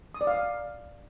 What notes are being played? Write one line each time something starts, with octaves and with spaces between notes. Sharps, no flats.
D#6
D5
F5